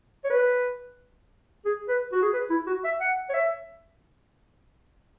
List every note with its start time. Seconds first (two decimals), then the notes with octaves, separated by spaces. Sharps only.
0.24 C#5
0.30 B4
1.65 G#4
1.88 B4
2.12 F#4
2.22 G#4
2.33 B4
2.50 E4
2.67 F#4
2.84 E5
3.01 F#5
3.30 C#5
3.34 E5